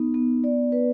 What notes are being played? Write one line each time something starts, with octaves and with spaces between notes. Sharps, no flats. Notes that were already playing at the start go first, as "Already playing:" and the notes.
Already playing: B3 D#4
B3
D5
B4